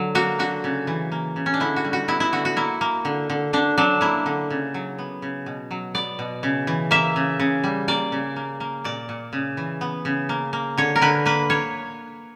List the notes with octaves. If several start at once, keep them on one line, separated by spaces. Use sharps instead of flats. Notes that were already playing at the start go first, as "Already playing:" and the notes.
Already playing: D3 F#3
A#3 F#4
D3 F#4
C#3
E3
A#3
C#3
C#4
D4
D3 E4
F#4
G3
F#4
B3 E4
E4
D3 F#4
F#4
A#3 E4
A#3
D3
D3
D3 D4
F#3 D4
A#3 E4
D3
C#3
F#3
B3
C#3
B2
F#3
B3 D5
B2
C#3
E3
A#3 E5
C#3
C#3
G3
A#3 D5
C#3
A#3
A#3
A#2 D5
A#2
C#3
E3
B3
C#3
A#3
A#3
D3 C#5
A#4
D3 B4
A#3 B4
A#3 C#5